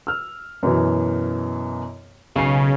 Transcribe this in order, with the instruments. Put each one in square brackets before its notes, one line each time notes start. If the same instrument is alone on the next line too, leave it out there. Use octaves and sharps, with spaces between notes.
[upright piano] E6 F6
F#2 B2 E3
[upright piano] B1 C7 [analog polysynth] C#3